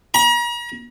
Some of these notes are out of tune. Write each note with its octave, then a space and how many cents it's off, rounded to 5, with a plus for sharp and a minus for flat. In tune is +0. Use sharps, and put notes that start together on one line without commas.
A#5 +40